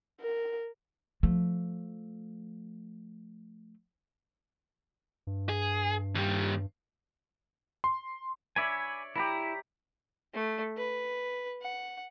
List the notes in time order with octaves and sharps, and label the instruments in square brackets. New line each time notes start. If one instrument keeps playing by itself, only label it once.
[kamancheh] A#4
[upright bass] F3 A3
[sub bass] G2
[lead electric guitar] G#4
D#2 G3
[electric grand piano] C6
[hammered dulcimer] C#5 D5 E5 [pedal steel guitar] G#5 B5
[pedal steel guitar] E4 [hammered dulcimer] G4 A#5 B5
[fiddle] A3
B4
F#5